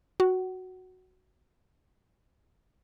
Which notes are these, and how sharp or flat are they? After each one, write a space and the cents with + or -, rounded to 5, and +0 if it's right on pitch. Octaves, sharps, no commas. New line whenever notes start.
F#4 +0 F#5 +30